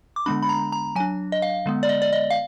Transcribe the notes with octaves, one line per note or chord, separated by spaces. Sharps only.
D6
D3 G#3 B3 D4 B5
B5
A#5
A#5
F#3 D4 G#5
D#5
F5
D3 G#3 B3
D5
D#5
D5
D#5
F5